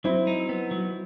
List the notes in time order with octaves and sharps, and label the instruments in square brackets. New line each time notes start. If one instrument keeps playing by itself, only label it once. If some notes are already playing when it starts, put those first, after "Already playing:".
[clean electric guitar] F#3 [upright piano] C4 E4
[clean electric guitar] D#4
B3
F#3